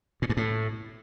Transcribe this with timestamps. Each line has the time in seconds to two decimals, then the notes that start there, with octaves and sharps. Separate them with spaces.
0.22 A#2
0.29 G2
0.37 A2